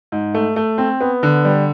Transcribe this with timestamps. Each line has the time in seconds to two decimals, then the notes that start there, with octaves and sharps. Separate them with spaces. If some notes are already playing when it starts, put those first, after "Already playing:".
0.12 G#2
0.34 A3
0.56 A3
0.78 C4
1.01 B3
1.23 D3
1.45 G3